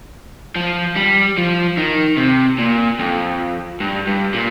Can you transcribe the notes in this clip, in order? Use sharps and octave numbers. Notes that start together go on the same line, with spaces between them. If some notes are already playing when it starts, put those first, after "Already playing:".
F3
G3
F3
D#3
C3
A#2
F2
G2
G2
A#2